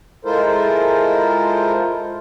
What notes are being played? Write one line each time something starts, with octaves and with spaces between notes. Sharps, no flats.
G#3 E4 F4 A4 A#4 C5